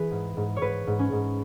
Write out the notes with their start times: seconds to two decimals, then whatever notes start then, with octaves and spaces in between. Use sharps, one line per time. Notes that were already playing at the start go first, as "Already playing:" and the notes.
Already playing: E3 G#4 B4
0.11 G#2
0.37 G#2
0.56 C#5
0.62 G#2 B4
0.87 G#2
0.99 C#4
1.12 G#2